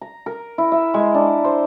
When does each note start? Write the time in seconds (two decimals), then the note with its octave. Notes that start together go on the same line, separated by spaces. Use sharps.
0.01 A#5
0.26 A#4
0.58 E4
0.72 E5
0.94 G#3
1.15 D4
1.44 C5